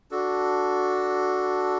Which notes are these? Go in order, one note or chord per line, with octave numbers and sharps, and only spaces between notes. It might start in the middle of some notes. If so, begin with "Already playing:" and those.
D4 F#4 A4